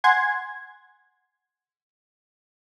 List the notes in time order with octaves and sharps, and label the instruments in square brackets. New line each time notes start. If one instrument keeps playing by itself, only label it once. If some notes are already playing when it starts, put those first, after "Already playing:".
[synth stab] F#5 G#5 C6 G#6